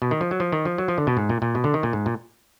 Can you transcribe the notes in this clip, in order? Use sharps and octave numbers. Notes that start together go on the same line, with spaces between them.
B2
D#3
F3
F#3
F3
D#3
F3
F#3
F3
D3
B2
G#2
A#2
A#2
B2
D3
D#3
A#2
G#2
A#2